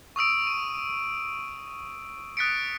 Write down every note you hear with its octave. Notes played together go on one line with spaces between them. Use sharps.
C#6 D#6 E6 D7
D#7
D#6 F#6 A6 B6 C#7 D7